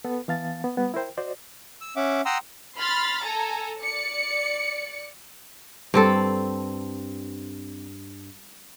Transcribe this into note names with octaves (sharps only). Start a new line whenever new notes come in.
B3 A4 B4
E3 B3 F5 A5 A6
B3
G3 B3
E4 A#4 C5 G5
F#4 C5 D5 D#5
E6
C#4 E5 F#5 D6
F#5 G5 A#5 C6 D#6 E6
B5 C6 F6 A6
A4 G#5 A#5
D5 C#7
G2 C4 A4